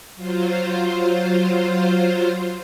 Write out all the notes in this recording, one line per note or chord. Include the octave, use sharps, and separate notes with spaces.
F#3 F4 C5